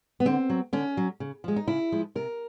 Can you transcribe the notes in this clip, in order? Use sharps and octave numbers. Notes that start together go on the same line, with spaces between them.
B3
D3 C4
F#3
D3 C#4
F#3
C#3
F3 G#3
D#4
C#3 E4
F3 G#3
C3 A#4